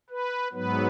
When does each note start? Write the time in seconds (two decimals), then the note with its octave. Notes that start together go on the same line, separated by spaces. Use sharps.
0.10 B4
0.53 G#2 F#3 B3 B4